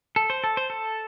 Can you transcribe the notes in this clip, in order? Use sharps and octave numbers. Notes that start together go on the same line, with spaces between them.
A4
C5
A4
C5
A4